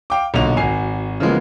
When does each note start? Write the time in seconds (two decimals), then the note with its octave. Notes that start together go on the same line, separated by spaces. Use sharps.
0.10 F5 G5 D6
0.34 B1 A#2 D3 D#5 F7
0.57 G#1 F#4 G#5 C7
1.20 C#3 E3 F3 G#3 A#3 B3